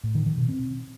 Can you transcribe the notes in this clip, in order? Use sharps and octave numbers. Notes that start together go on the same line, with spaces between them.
A2
D#3
D#3
B2
C4